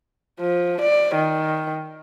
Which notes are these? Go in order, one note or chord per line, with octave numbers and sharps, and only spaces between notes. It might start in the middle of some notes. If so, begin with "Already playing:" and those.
F3
D5
D#3